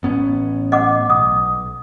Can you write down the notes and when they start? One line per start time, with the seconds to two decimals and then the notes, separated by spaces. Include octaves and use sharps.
0.03 A1 B3 C#4
0.72 D#5 F#5 D6
1.10 B1 D#6